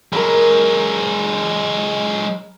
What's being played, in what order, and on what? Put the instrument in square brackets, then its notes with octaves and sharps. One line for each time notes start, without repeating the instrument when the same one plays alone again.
[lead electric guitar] F#3 G#3 [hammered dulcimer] A#4 B5